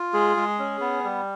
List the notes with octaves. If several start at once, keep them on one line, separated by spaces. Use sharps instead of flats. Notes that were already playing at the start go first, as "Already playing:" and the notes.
Already playing: F4
G#3 G#4
G#3
C#4
B3
G3